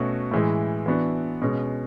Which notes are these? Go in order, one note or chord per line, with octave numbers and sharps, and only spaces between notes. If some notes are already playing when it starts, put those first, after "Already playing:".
Already playing: B2 A3 C#4 F#4
A2 E3 G#3
E3 B3 D4 F#4
B2 G#3 C#4